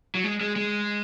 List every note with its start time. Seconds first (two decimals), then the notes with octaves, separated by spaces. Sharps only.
0.15 F#3
0.24 G#3
0.41 G#3
0.56 G#3